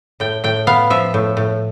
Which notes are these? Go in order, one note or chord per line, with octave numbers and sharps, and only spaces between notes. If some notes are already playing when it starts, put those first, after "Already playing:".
A2 G5
A2 G5
B3 F5
F3 E5
A2
A2